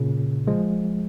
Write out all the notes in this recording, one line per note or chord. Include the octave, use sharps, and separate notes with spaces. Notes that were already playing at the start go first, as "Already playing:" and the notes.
Already playing: A#2 C#3
F3 G#3